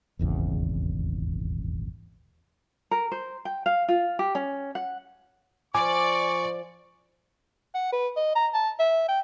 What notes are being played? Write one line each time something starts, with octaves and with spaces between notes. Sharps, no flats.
D#1 G#1 E2 C#3
A#4
C5
G5
F5
F4
G4
C#4
F#5
F3 D5 G#5 C#6 D6
F#5
B4
D#5
A#5
A5
E5
G5